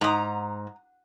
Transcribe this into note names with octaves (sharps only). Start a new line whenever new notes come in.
G#2 A#5 D#6